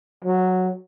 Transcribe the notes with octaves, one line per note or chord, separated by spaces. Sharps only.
F#3